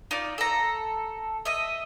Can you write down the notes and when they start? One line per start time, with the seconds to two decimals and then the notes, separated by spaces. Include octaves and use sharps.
0.11 D#4 F4 D5
0.38 A4 A#5
1.45 D#5 E5